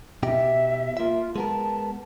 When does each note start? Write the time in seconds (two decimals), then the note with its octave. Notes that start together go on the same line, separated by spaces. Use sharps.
0.23 B2 D#4 G4 E5
0.97 A#3 F4 E5
1.36 G#3 B3 A#4 A5